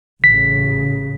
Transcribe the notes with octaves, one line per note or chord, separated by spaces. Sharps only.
A1 C#3 B6